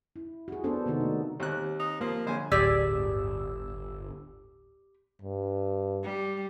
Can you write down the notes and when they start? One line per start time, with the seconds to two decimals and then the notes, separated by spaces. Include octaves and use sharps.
0.16 E4
0.48 F#4 G#4
0.64 B3 D4 A4 C5
0.86 C3 D#3 A#3 B3 D#4 F#4
1.01 A3
1.40 D#2 C4 G4 F#6
1.79 D#4
2.01 F3 A#3
2.27 A#1 D3 F3 C5 C#5 G#5
2.52 D1 G1 G4 G#4 D5 E6
5.22 G2
6.04 G3